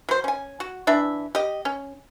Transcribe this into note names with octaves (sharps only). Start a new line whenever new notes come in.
F#3 C5
C#4 G#5
F#4
E3 D4 E5
G4 D#5
C#4